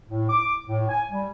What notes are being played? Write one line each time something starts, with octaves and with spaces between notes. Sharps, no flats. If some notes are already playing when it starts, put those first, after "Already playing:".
A2
D6
A2
G#5
G3